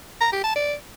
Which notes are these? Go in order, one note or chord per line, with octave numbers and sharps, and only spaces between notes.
A#5
G4
A5
D5